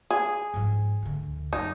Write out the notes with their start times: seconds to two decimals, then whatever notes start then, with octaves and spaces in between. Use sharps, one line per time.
0.11 G#4
0.54 G#2 F3
1.03 D2 D3
1.53 F#2 D#4